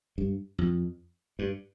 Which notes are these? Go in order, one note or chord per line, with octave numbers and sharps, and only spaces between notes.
G2
F2
G2